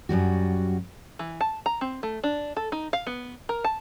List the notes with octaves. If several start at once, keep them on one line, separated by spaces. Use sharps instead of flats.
F#2 F#3 G3 F#4
E3
A5
A#5
C4
A3
D4
A4
D#4
F5
B3
A#4
A5